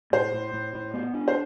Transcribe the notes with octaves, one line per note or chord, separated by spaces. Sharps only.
A2 C5
A2
A2
A2
B3
D4
C5